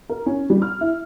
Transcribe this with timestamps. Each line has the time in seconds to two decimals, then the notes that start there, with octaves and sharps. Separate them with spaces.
0.09 A#4
0.26 C#4
0.50 G3
0.62 F6
0.81 E4